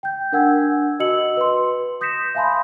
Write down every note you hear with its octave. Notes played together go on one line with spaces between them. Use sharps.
G5 G6
D4 A#4 F#5 G#5 E6 G#6
F#4 D#5 A5 E6 C#7 F#7
B4 C6
D#6 G6 A#6 B6 C#7 E7
E5 F5 G#5 A5 B5 C6